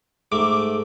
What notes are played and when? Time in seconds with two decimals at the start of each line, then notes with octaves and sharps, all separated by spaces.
0.32 G#2 A3 D6